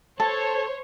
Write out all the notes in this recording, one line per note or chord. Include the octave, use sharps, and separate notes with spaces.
A4 C5 C#5 A5